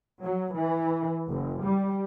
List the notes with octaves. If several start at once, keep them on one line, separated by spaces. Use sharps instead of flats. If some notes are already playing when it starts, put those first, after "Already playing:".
F#3
E3
F#1
G3